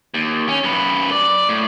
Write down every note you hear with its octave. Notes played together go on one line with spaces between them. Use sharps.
D#2
C#4
F#2 B4
D5
A2